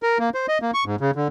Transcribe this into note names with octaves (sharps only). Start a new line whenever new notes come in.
A#4
A#3
C5
D#5
A#3
C#6
G#2
C#3
D3